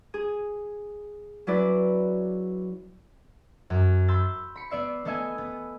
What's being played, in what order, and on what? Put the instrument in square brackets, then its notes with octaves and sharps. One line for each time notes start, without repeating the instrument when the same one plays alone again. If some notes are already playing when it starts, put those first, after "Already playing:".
[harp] G#4
F#3 C#4 E4 B4 D5
F#2
B5 C6 E6 G6 A6
B5 C#7
B3 D5 E5 C7
A3 B3 A4 D#5 E5 G#5
B3